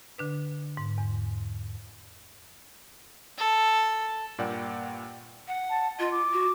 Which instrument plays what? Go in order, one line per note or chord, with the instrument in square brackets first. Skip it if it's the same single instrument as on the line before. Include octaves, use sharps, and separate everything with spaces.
[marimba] D3 D4 B4
G#2
E2
[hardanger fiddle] A4
[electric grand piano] G2 A#2 A#3 D5 F#5 G5
[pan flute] F#5
[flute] A5
[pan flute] F4 [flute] D#5
[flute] D6
[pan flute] F#4